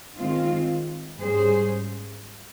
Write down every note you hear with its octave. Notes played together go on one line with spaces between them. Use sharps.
D#3 G#3 C4 F4
G#2 G3 C#4 G#4 C5